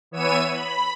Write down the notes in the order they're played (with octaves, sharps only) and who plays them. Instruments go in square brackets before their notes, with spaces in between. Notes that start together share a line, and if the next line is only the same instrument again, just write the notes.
[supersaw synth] E3 B3 C#5 E6 D#7
B5